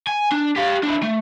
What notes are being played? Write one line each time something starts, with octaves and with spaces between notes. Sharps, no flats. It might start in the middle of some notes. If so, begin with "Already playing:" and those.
G#5
D4
G4 F5
D4 E4
A3